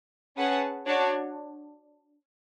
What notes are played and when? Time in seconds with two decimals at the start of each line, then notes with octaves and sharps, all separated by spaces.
0.37 C#4 G#4 B4 F#5 A5
0.86 D4 F#4 C#5